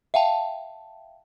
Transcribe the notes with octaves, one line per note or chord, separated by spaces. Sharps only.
E5 F5 G5 A5